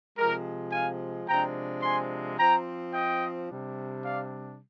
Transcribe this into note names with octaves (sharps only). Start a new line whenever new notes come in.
C3 F3 G#3 G4 A#4
F5 G#5
C3 F3 G#3 D4 G5 A#5
G#5 C6
F3 C4 G5 A#5
D#5 G5
C3 G3 D4
D5 F5